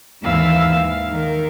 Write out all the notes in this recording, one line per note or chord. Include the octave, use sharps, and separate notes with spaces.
D#2 G#2 E3 E5 F5 E6
F5
D#3 A#4